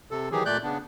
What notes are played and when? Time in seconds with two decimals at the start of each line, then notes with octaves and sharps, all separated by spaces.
0.11 C3 A4
0.32 D#3 E3 F#3 G4 G#4
0.46 A#2 A3 D5 F#6 G6
0.63 C#3 B3 D4